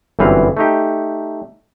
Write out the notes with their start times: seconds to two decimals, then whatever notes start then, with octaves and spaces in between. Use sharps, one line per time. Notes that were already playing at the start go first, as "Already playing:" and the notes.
0.19 G1 F#2 E3 C4 B4 F5
0.57 A3 D#4 G4